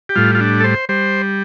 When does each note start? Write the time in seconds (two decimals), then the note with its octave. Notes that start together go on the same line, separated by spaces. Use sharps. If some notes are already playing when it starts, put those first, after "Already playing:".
0.09 G4
0.16 A2 G3 F4
0.35 F4
0.40 D4
0.60 A4
0.64 C5
0.89 G3 C5